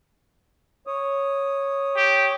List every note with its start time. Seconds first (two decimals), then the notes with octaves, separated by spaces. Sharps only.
0.87 C#5 D#6
1.96 G4